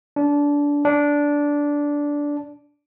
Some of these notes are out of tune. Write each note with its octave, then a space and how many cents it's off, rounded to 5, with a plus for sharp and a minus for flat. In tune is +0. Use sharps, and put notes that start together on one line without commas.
D4 -20
D4 -10